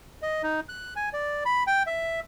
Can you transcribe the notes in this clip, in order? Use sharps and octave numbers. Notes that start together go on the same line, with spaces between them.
D#5
D#4
F#6
G#5
D5
B5
G5
E5